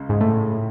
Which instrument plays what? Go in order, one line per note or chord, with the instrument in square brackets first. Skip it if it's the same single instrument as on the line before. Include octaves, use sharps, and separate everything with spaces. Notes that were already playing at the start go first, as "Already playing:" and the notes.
Already playing: [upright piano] C#2 C#3
[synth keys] G#2
A2